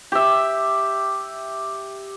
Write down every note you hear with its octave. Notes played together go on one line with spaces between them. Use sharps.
G4 E5